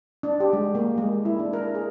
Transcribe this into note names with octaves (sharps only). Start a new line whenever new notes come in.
D4
G4
G#3
A#3
G#3
E4
D4
A#4
G#4